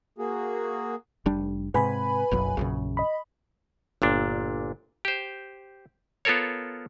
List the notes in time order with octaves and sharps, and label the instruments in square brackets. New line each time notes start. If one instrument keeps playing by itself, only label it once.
[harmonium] A#3 F#4 G#4
[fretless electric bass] F1 G3 D4
[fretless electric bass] G#2 C3 [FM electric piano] B4 G#5 B5
[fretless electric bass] F#1 B1 F#2
A#1 F#2 C#3
[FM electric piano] D#5 B5
[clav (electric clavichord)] G1 A#2 D4
G4 C5
B3 F4 A4 A#4 C#5